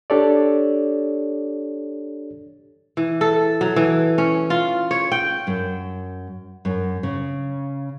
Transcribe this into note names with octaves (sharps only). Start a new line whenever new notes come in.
D4 G4 A4 C#5 D5
E3
A4
F#3
E3
C#4
F4
C#5
G5
F#2
F#2
C#3